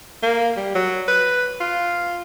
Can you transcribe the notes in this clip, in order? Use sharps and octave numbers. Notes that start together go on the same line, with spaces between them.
A#3
G3
F#3
B4
F4